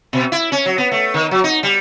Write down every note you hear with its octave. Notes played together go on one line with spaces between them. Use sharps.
B2
E4
C#4
F#3
B3
A3
D#3
F#3
D#4
G3